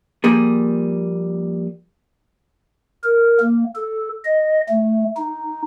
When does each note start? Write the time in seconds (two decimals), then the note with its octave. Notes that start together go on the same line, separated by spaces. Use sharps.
0.24 F3 G3 A#3 G#4
3.04 A#4
3.40 A#3
3.76 A4
4.25 D#5
4.69 A3
5.17 D#4